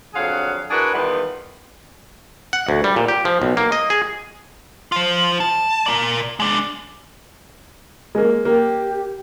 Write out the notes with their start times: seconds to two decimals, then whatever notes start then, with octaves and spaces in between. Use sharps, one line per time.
0.14 F2 D3 F#3 G#4 F5 F#5
0.71 D4 E4 F#4 G#4 A#4 B4
0.94 E2 D#3 G3 B3 F4 B4
2.53 F#5
2.69 D2
2.84 G3
2.96 A#2
3.08 G4
3.25 F3
3.42 B1
3.57 A#3
3.72 D#5
3.90 G#4
4.92 F4 C5
5.40 A5
5.86 A#4 D5
6.40 G#3 D4
8.15 G#3 A#3
8.45 A#3 G4